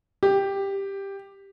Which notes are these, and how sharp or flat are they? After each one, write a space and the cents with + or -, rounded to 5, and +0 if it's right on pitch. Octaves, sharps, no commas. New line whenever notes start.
G4 +5